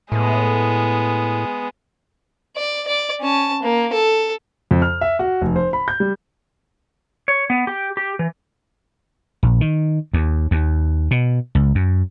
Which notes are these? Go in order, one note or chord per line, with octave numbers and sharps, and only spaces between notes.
A2 G#3 B3
D5
D5
C#4 A5
A#3
A4
F2
F6
E5
F#4
F1
C5
B5
G6
G3
C#5
B3
G4
G4
E3
A#1
D#3
D#2
D#2
B2
C#2
F#2